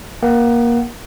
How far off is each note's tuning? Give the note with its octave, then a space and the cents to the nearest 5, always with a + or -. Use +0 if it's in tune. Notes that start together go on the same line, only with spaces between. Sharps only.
A#3 +20 F#5 +25